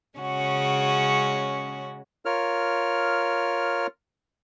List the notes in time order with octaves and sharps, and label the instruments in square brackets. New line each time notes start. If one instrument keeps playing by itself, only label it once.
[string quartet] C#3 G#3 C#4 F#4
[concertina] F4 A#4 C#5 F6